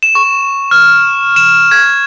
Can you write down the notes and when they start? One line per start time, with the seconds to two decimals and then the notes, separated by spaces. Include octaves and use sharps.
0.03 E7
0.15 C#6
0.71 F6
1.36 E7
1.71 G#6